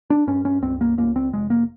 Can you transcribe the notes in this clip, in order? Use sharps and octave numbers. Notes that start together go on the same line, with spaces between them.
D4
G2 C#4
C#4
C#2 C4
A#3
C#2 A#3
C4
F1 G#3
A#3